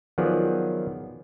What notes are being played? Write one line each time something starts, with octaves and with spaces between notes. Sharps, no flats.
D#3 F3 F#3 B3 G#4 D5